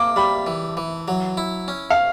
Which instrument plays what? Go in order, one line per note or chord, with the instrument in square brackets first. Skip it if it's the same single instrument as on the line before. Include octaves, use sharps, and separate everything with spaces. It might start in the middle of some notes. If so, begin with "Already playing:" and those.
Already playing: [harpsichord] A#3 [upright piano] D6
[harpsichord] G3 [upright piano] B5
[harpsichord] E3
E3
F#3
E4
C#4
[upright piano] F5